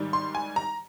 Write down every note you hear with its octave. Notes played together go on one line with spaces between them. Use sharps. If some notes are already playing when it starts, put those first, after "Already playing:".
Already playing: G#2 D#3 G3
C6
G#5
A#5